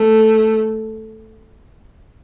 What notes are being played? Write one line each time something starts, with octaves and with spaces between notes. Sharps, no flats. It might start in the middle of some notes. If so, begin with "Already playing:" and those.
Already playing: A3